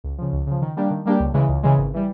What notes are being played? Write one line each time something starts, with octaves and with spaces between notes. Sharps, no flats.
C#2
C#3 F3
C#2
C#3 F3
D#3
G3 A#3 D4 G4
D#3
G3 A#3 D4 G4
C#2
C#3 E3 G#3
C#2
C#3 E3 G#3
G#1
E3 G3